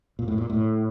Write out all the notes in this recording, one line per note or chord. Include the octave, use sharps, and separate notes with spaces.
A#2
A2
A#2
A2